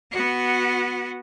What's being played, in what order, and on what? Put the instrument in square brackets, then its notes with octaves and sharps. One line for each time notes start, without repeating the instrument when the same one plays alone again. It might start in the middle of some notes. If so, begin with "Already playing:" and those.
[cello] B3 F#4